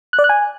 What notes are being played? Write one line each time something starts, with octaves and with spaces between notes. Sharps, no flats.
F#6
D5
F#6
G#5